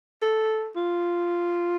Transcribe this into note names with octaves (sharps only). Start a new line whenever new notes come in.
A4
F4